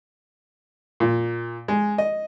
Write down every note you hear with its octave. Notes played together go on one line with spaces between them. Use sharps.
A#2
G#3
D#5